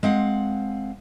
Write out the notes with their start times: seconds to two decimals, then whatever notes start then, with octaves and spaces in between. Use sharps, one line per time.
0.03 G#3 C4 F5 F#5